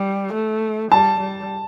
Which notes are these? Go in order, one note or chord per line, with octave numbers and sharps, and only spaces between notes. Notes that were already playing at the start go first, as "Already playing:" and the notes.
Already playing: G3
A3
G3 A5
G3